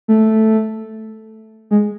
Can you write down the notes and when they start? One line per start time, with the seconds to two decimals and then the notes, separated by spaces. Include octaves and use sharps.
0.08 A3
1.71 G#3